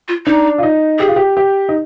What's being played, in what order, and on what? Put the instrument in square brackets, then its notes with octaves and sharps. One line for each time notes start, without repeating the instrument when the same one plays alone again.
[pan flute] F4
[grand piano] D4 [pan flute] D#4
[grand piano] F4
D#4
[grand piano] G4 [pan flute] G#4
[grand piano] F4
G4
G4
D#4